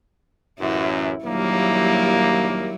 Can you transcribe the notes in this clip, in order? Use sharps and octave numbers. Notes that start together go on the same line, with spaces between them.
A1 F#2 E4
A#1 D#2 F#3 G3 A#3 E4